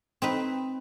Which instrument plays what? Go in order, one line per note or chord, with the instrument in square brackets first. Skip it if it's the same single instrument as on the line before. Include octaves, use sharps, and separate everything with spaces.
[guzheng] C4 D#4 B4